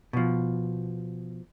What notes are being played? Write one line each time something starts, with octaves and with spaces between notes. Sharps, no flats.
B2 F3